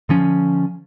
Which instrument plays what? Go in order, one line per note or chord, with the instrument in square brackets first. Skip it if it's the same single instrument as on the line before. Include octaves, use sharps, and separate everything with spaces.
[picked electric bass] D3 F3 C#4